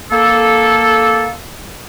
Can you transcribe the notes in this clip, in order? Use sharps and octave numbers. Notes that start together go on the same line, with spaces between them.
A#3 A4